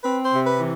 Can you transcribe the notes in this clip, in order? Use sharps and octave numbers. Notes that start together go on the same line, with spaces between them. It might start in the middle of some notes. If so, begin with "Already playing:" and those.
C4 B4
C5
C3
B4
E3